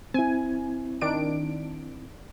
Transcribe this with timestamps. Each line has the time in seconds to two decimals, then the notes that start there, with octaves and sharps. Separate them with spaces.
0.14 C4 E4 G#5
1.01 D#3 D4 D7